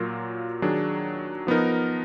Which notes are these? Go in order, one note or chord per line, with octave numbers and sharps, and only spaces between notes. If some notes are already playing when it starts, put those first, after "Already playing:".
Already playing: A#2 F#3 A#3 F4 A#4
D#3 F#3 D4 G#4
F3 B3 D#4 A#4